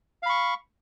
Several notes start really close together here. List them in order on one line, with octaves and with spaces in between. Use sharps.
F5 B5 C#6